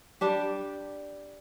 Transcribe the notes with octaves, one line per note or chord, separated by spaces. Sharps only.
G3 D4 G4